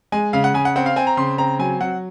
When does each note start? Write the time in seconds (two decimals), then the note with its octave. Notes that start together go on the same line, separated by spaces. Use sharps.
0.12 G#3 G#5
0.33 C#3 F5
0.44 F#5
0.54 C#3 G#5
0.65 F#5
0.76 C4 F#5
0.86 F5
0.96 C4 G#5
1.07 A#5
1.17 C#3 C6
1.38 C4 A#5
1.59 F#3 G#5
1.80 F#3 F#5